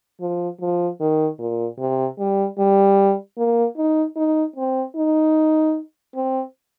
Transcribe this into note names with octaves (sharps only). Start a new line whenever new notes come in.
F3
F3
D#3
A#2
C3
G3
G3
A#3
D#4
D#4
C4
D#4
C4